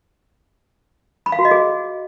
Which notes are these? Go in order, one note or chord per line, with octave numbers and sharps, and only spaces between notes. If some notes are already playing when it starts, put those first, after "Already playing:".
B5
F5
F#4
D#5
G#4